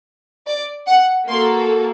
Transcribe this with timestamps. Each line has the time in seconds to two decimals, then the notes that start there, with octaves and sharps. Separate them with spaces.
0.48 D5
0.87 F#5
1.27 A#3 F#4 A4 C6